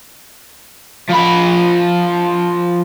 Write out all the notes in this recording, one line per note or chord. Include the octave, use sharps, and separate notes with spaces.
F3 B5